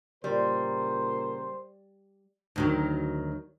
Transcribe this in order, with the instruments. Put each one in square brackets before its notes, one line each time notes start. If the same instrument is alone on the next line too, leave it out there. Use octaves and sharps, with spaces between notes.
[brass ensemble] A#2 C#3 A#4 [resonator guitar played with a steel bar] G3 [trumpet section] C5
[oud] D2 D#3 F#3